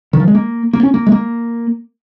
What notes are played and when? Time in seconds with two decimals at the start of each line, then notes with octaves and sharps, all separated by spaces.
0.13 D#3
0.20 F3
0.28 G#3
0.35 A#3
0.73 A#3
0.83 C#4
0.94 A#3
1.07 G#3
1.12 A#3